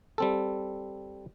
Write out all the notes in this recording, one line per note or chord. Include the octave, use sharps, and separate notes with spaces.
G3 C4 A4